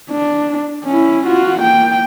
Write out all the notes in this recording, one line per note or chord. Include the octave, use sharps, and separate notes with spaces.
D4
C#4 E4
F4 F#4
A#3 G5